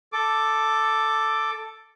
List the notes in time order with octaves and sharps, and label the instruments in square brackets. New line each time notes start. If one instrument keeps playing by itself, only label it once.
[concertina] A4 D6